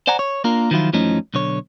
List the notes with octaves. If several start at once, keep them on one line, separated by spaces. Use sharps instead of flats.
C5 D5 F#5 G#5 A#5
C#5
A#3 D4 F4 A#4
D#3 F3 F#3 E4 F4
F#2 E3 F3 A3 C#4 D#4
B1 D3 C#5